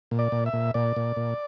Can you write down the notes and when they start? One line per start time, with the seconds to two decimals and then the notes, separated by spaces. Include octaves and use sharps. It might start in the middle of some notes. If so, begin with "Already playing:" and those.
0.11 A#2
0.19 D5
0.32 A#2
0.46 E5
0.53 A#2
0.74 A#2 D5
0.96 A#2
1.16 A#2